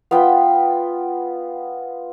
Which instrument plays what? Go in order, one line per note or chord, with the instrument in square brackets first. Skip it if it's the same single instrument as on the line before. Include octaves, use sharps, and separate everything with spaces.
[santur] B3 F4 G5 B5